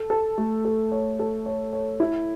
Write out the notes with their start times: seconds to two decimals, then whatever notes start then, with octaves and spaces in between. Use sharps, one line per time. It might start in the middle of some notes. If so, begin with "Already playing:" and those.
Already playing: A4
0.10 A4
0.38 A3
0.65 A4
0.92 C#5
1.19 A4
1.46 C#5
1.73 C#5
2.00 E4